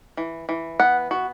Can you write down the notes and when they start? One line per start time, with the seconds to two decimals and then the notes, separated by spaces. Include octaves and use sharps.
0.17 E3
0.49 E3
0.80 B3 F#5
1.11 B3 F#4